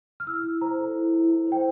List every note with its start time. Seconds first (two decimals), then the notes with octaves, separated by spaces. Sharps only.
0.20 F6
0.27 E4 E6
0.44 E4
0.61 C5 A#5
0.79 A4
0.96 E4
1.13 E4
1.29 E4
1.47 C5 G5